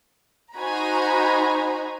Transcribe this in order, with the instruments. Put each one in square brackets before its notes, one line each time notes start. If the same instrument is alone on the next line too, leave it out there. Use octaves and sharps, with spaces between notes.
[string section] D#4 F#4 C5 G#5 A#5 B5